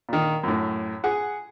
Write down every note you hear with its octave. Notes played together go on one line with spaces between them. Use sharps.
A#2 D#3
F#2 A2
G#4 F#5